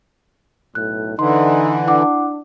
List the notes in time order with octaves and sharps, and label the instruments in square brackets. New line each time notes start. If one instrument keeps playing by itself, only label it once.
[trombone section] B1 A2 [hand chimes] F#6
[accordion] D3 E3 [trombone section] D#4 [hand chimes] C6
[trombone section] D4 [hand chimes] E4 F#5 D6